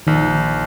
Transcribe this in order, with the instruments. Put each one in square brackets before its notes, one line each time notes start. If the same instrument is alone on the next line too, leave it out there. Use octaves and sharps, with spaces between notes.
[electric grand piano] A#1 [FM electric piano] D#3